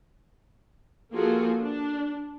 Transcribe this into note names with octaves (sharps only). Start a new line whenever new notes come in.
F3 A#3 F4 F#4 G#4 A4
D4